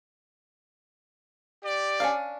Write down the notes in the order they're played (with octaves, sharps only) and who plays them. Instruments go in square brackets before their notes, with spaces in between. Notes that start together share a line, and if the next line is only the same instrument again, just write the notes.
[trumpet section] G4 D5
[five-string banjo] C#4 D4 F5